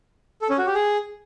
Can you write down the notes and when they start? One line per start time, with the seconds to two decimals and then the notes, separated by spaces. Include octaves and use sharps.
0.42 A4
0.50 C#4
0.58 F#4
0.66 G4
0.75 G#4